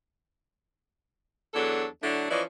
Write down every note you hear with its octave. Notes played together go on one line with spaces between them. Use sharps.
E2 F#3 D4 A4
D3 F#3 A3 D4 E4
E3 F3 C#4 D5 D#5